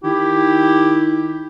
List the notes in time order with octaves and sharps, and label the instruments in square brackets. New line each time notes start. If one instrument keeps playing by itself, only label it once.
[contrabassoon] D#3 [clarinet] E4 [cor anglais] G4